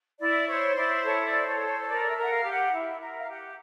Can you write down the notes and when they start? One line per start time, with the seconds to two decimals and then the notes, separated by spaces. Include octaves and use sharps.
0.19 E4 D5
0.48 C5 C#5
0.76 E4 D5
1.03 A4 C#5
1.25 D5
1.32 C5
1.46 C#5
1.60 A4
1.67 C#5
1.80 C#5
1.87 A#4 D5
2.09 E5
2.16 A#4 F#5
2.30 F5
2.44 G4
2.51 F#5
2.62 F5
2.72 E4 E5
2.99 A#4 E5
3.19 F5
3.27 G4 F#5